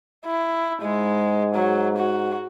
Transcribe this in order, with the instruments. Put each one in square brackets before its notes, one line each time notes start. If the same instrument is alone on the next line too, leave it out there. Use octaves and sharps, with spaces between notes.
[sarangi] E4
[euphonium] G#2 [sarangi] G#3
[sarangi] F#3
F#4